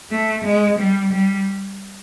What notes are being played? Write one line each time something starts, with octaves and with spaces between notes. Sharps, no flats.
A3
G#3
G3
G3